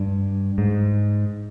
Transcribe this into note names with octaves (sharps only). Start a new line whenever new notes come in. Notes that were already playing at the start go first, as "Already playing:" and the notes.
Already playing: G2
G#2